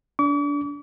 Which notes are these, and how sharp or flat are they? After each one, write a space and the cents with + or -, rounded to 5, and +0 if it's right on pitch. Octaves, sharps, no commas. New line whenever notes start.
D4 -25 D6 -45